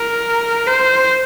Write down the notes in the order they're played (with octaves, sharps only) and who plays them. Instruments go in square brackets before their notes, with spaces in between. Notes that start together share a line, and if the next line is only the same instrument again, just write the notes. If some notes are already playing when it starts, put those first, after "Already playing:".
Already playing: [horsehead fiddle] A#4
C5